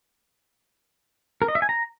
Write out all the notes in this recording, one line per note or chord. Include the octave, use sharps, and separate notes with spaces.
A#4
D#5
E5
G#5
A#5